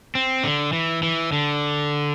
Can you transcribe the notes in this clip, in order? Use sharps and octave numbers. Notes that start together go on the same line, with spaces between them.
C4
D3
E3
E3
D3